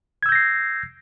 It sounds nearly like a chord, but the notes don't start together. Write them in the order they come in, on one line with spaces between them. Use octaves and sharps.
G#6 E6 G6 A#6 C7